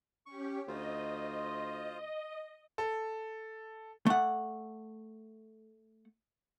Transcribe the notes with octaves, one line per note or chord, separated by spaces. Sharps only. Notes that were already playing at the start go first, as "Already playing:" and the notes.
C#4 G4 C#6
D2 F4 C5 D#5
A4
A3 F#5